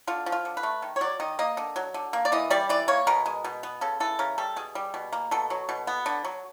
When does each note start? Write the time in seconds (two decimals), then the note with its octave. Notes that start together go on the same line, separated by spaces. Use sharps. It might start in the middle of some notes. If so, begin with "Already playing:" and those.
0.07 D3 F4
0.26 F3
0.32 F4
0.45 D3
0.57 B4
0.63 A3
0.82 D#3
0.96 C#5
1.01 F#3 D5
1.20 D#3 D#5
1.39 A#3 D#5
1.57 D3
1.76 F#3
1.94 D3
2.13 A#3
2.25 D5
2.32 E3 D#5
2.50 G3 D5
2.69 E3 D5
2.88 A#3 C#5
3.07 B2 A#4
3.26 G#3
3.44 B2
3.63 B3
3.81 C#3 A4
4.00 E3 A4
4.19 C#3 A#4
4.38 G3 A4
4.56 B2 G#4
4.75 G3
4.94 B2
5.12 A#3
5.31 B2 A4
5.50 F#3
5.69 B2
5.87 B3
6.06 D3
6.25 F#3